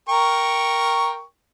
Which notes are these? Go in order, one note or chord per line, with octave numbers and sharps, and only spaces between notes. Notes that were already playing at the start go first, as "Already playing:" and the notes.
A#4 G5 C#6